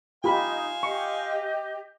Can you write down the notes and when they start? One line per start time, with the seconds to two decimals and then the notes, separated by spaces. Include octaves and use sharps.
0.24 D#4 F4 G4 C5 D#5 F5 G#5 B5
0.83 G4 D#5 C#6